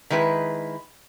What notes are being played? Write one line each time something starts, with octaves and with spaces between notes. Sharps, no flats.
D#3 G#3 E4 B4